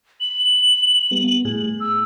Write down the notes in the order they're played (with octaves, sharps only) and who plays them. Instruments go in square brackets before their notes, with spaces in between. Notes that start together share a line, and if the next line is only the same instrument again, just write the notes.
[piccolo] F#7
[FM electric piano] G3 B3
A2 G#4
[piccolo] E6